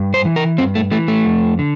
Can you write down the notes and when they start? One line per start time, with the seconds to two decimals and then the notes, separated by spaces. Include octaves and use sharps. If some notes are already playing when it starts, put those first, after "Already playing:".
Already playing: G2
0.14 C5
0.25 E3
0.36 A#4
0.58 G2 C4
0.75 A3
0.91 E3 A3
1.08 A3
1.25 F2
1.59 D3